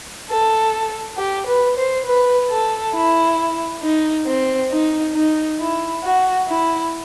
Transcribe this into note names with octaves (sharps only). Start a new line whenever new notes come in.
A4
G4
B4
C5
B4
A4
E4
D#4
C4
D#4
D#4
E4
F#4
E4